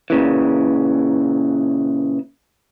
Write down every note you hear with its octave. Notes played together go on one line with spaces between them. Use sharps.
A#2 C#3 E3